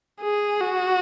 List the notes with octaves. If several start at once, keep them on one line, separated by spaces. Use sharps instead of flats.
G#4
F#4